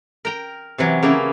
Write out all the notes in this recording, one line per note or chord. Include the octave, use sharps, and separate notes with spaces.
A#4 G5 A#5
C3 E3 F#3
C#3 A#3 C#4 E4